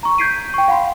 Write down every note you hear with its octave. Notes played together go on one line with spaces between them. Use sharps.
A#5 C#6
G6 G#6 B6 C7 D7 D#7
G5 C#6
F5 F#5 B5 C6